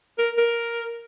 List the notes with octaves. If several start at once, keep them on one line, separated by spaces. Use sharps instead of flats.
A#4
A#4